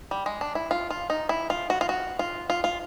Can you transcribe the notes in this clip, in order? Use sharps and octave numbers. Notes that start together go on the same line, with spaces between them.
G3
G#3
D4
E4
F4
F4
D#4
E4
F4
F#4
F4
F#4
F4
F4
F4